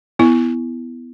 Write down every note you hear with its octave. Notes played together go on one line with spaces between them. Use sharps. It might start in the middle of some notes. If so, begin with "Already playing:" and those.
B3 E4